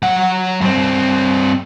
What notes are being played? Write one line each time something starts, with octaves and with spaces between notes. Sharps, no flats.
F#3 F#5
G2 C4